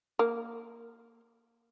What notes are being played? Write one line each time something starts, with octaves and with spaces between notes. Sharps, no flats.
A#3